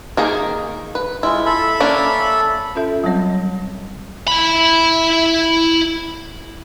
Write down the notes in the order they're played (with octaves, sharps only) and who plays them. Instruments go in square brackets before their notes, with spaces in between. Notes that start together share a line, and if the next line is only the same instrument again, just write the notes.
[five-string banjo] D#3 A#3 G#4
B4
[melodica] G#3 F4 [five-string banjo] E4
[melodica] A4 E5 B5
[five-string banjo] A#3 C#4 D4
[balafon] C#4 F4 A4 E5
F#3 G3 C4 C#5 D#5
[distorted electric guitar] E4 B5